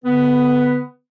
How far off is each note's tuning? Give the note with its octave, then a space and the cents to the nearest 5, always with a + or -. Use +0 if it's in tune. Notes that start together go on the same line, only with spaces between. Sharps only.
D3 -25 B3 +15 B4 +0